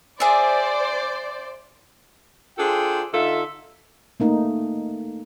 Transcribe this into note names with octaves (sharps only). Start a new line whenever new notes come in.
G#4 C5 D5 E5
D4 F4 G#4 A4 C5 G5
D3 D#4 F4 A4 E5
A3 A#3 D#4